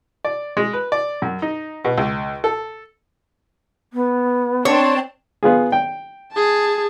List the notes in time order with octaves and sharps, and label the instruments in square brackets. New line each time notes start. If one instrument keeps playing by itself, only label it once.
[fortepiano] D5
G#3
B4
D5
F#2
D#4
B2
C#2
A4
[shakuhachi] B3
[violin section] C4 D4 A5 [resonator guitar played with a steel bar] C#5
[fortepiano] B3 F4 G#4
G5
[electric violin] G#4 A5